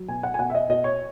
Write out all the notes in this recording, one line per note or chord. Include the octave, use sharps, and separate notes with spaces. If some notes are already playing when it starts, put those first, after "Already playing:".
Already playing: F#3
B2 G#5
F#5
G#5
B2 F#5
E5
D#5
B2 D#5
C#5